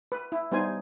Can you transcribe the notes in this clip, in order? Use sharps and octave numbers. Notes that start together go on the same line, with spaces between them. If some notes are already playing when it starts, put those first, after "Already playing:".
B4
E4
G3 B3 D#4 C5 G#5